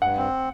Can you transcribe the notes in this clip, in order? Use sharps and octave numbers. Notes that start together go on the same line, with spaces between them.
G2 F#5
C4